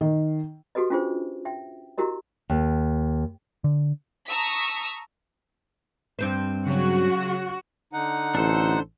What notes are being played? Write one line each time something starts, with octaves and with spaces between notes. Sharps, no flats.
D#3
F#4 G4 A4 B4 D#5
C#4 D4 F4 G#4 C5
E5 G5
E4 F#4 G4 A#4 D#5
D#2
D3
A5 A#5 C#6 D#6 E6 B6
G2 C4 C5
C#3 F#3 F#4
D3 D#4 F#5
A1 D4 A4 C5